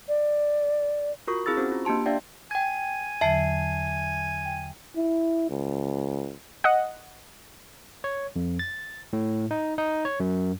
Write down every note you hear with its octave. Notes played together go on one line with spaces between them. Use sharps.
D5
F4 F#4 A#4 C#6
C4 E4 G#4 B5 E6 A6
C4 C#4 F#4 C5
F4
A#3 D4 G4 A5 C6
D4 D5 E5 F5 G5
G5 G#5 G#6
E2 D3 F#3 E5 A5 C7
G5
E4
C#2
D#5 F#5
C#5
F2
A6
A2
D#4
D#4
C#5
F#2